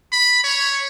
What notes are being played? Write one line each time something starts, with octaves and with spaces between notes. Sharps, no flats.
B5
C#5